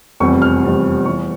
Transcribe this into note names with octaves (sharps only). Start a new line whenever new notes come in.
F1 E2 C3 G3 C#6
F6
F1 E2 C3 G3
E2 E3 G3 C#6